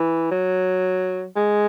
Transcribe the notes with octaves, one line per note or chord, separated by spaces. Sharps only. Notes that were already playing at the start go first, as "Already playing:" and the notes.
Already playing: E3
F#3
G#3